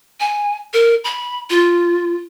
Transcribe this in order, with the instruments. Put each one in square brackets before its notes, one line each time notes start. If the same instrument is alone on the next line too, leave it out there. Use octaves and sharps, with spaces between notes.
[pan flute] G#5
A#4
B5
F4